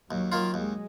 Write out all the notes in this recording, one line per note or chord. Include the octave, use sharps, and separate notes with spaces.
D#2 F#3
D#3 A#3 F4
D#2 G#3